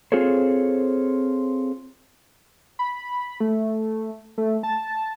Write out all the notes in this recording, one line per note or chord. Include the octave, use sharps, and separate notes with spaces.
C4 F4 G#4 A4 C5 C#5
B5
A3
A3
A5